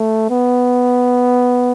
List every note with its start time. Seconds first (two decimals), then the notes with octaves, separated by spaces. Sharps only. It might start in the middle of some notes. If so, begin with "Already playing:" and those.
Already playing: A3
0.30 B3